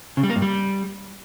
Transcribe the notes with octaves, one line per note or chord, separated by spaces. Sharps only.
C#3
G3
A#3
G2
G3